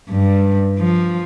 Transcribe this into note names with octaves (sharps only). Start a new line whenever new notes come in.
G2
F3